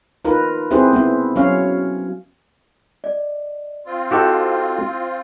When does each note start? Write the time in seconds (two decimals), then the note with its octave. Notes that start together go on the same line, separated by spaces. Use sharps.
0.25 D#4 F4 A#4 B4
0.71 C4 E4 G4 G#4 B4 C5
0.93 B3 E4
1.36 F#3 C#4 C#5 F5
3.04 D5 D#5
3.86 C4 F4
4.11 E4 F#4 G4 A4 D#5